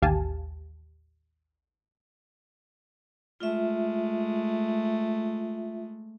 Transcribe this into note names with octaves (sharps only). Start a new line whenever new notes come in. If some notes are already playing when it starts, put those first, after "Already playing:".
A1 D#2 G4 F5 G#5 A5
G#3 A3 F4 E5